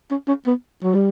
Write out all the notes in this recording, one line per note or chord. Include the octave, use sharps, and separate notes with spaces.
C#4
C#4
B3
F#3
G3